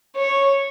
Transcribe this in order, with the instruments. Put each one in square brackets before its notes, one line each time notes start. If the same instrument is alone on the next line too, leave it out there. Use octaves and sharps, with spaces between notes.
[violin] C#5